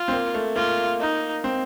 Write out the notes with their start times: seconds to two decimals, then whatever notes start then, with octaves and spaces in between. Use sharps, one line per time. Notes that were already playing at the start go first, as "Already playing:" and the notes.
Already playing: F4
0.08 C4
0.13 A#3
0.34 A3
0.56 A#3 F4
1.00 D#4
1.44 C4